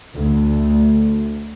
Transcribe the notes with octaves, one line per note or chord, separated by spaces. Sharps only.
D2